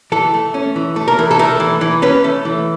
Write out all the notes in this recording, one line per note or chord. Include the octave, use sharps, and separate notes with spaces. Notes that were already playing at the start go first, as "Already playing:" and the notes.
E3 A4
A3
C#4
E3
A3
A#4
E3
A4
A3 A#4
E3
E3
C#4 B4
A3
E3